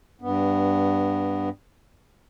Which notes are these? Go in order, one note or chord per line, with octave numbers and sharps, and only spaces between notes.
G2 B3